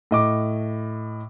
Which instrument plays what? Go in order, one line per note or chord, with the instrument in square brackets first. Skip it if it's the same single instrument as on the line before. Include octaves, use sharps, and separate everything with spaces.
[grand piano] A2 D#5 D6